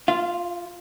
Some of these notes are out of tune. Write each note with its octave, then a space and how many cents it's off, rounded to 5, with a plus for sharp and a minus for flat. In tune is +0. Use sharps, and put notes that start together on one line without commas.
F4 +0 F5 -45